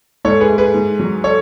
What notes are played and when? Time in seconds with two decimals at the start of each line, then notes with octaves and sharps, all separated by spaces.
0.25 G#2 A4 C#5
0.41 G#4 B4
0.49 A3
0.58 G#4 B4
0.74 G#2
1.00 F#3
1.24 A3 A4 C#5